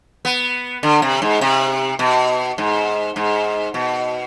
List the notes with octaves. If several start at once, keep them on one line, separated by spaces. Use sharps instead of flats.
B3
D3
C3
G#2
C3
B2
G#2
G#2
B2